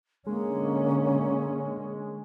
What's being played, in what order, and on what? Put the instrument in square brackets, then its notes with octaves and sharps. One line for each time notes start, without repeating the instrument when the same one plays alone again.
[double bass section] D3 C#4 [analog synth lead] G#3 [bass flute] A#3